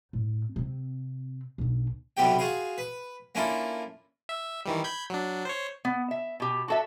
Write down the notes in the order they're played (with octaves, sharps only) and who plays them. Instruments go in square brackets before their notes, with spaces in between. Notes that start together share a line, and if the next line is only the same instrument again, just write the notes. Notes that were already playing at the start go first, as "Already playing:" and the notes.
[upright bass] A2
C3 C4
B1 D3
[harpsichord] B1 C3 G3 B3 G4 G5
F4 F#4 G#4 F5
B4
A#3 C#4 D4 E4 F4 A4
[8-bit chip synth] E5
D#3 E3 G3
B5 G6 G#6
F#3 D4
C5 C#5
[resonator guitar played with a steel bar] B3
E5
B2 G4
F#4 A4 E5